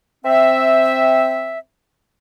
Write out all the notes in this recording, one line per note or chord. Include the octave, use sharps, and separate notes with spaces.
C4 E5